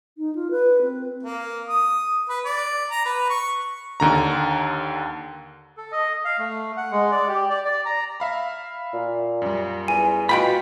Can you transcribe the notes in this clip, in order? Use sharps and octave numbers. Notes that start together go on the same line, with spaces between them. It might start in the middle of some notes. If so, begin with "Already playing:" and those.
D#4
F4
B4
C4
A#3
D#6
B4
D5
A#5
B4
C#6
D#2 D3 A#5
A4
D#5
F5
A3
F#5
G#3
D5
G4
D5
D5
A#5
E5 F5 B5
A#2
F#2 G3
E2 G#5
B2 F4 F#4 F5 G5 B5 C6